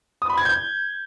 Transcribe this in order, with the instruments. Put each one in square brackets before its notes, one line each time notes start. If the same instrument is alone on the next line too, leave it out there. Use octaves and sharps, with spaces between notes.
[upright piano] D#6
B5
G#6
G6